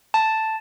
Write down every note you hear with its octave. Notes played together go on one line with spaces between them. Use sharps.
A5